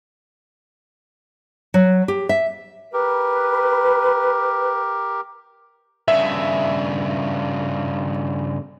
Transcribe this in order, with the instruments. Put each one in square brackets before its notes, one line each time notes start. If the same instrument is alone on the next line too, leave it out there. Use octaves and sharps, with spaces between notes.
[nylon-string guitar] F#3
G4
E5
[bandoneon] G4 A#4 [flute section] B4
[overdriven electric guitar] G2 C#3 [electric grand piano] E5